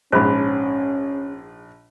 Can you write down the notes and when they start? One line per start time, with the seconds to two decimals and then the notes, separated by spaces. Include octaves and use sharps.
0.12 A#1 G#2 C#4 C5 B5